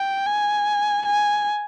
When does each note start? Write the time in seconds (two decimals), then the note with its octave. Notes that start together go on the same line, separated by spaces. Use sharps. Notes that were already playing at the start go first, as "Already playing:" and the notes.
Already playing: G5
0.26 G#5
1.06 G#5